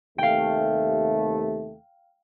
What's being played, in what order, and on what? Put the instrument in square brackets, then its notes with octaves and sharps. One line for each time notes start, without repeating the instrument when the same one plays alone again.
[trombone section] D#2 C3 A3 [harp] F5 G5